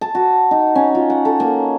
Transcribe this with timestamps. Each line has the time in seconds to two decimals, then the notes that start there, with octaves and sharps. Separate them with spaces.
0.01 A5
0.15 F#4
0.51 D#4
0.75 C#4
0.95 F4
1.10 F#5
1.25 A4
1.40 A#3